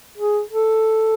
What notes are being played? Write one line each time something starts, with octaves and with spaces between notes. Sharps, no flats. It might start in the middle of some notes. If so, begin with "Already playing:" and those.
G#4
A4